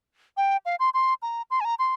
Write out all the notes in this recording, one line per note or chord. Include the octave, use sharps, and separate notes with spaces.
G5
F5
C6
C6
A#5
C6
G#5
A#5
C6